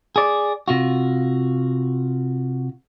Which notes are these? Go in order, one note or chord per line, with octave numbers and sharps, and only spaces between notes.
G#4 D5
C3 F4 F#4